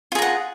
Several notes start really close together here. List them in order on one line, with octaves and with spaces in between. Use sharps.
F4 G#4 A#5 F#5